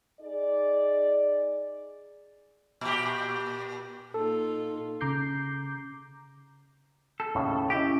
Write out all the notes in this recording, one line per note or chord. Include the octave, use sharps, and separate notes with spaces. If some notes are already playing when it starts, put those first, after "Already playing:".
D#4 G#4 D5
A#2 G4
A#2 D#4 F4 A4
C#3 A#5 D6 G6 C7
A4
D#2 A2 C#3
C#4 E4 G4 D#5